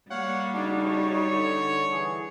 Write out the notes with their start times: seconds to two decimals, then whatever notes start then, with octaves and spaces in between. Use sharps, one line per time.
0.10 G3 A#3 C#5 F5 F#5
0.53 C#3 D4 D#4 F#4
0.84 C#5
1.31 D3
1.92 E3 G#4